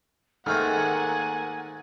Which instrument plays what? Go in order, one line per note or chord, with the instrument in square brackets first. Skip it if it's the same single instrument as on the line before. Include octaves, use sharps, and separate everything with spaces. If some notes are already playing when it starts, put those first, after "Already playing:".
[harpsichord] G#2 A3 C4 [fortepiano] D#3 F6 [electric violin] A#3 F#5 [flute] G#5